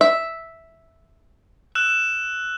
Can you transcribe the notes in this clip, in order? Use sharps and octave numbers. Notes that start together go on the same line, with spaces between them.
E5
E6 F#6 E7